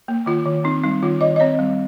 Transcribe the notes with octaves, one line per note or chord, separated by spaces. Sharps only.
A#3
D#3 F4
D#3
C4 D#4
G3 D#4
D#3 F4
D#3 D#5
D#5
C4 C#5
G3